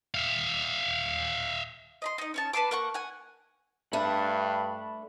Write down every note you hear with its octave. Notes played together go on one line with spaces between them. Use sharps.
E5 F5
D#5 B5 C6
D#4 D#5
C#4 C#5 A5
B4 A5 C6 D6
A#3 F#5 C#6
F#5 G#5
G2 A3 D4 B5